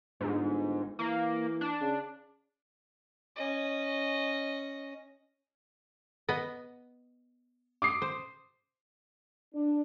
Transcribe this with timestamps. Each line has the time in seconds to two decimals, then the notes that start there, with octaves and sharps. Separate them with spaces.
0.20 G1 G#2
0.99 E3 A#3
1.61 D4
1.81 C#3
3.36 C#4 D#5
6.29 B3 D#5
7.82 D6 D#6 C7
8.02 C5
9.55 D4